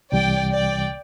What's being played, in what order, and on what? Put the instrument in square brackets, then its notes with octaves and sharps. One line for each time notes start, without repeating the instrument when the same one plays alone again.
[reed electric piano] C2 C3 E3 G3 [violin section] D5 G5
[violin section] D5 G5